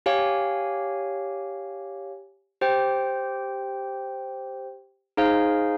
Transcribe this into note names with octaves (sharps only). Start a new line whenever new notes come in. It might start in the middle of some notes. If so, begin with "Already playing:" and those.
G4 C#5 F5 G#5
G4 C5 G5
D#4 G#4 C5 F5 G#5